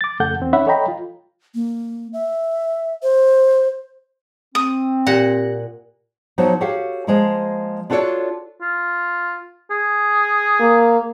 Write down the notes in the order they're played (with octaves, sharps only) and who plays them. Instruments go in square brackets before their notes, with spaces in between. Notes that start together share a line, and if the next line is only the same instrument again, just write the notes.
[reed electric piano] D6 A6
F2 C#3 A3 A4 F#5 G6
E2 C4
C#4 D#4 C#5 E5 F#5 B5
A4 C#5 D#5 G5 A#5 B5
F4
[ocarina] A#3
E5
C5
[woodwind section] C4 [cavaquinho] D#6
[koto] A#2 F#5 [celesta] G4 A#6
[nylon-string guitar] F3 F#3 B3 D#4 F#4
F#4 G4 A4 C#5 F5 F#5
F3 G#3 A#3
D4 F4 F#4 A4 C#5 D5
[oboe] F4
G#4
[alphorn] A#3